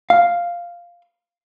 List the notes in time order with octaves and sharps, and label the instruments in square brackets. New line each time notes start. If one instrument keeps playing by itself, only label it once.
[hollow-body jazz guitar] F5